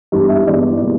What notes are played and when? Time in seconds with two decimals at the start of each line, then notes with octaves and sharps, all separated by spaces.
0.12 G2 E3 G#3 B3
0.29 E5
0.47 G2 E3 G#3 B3 D5
0.82 B2 G3 A#3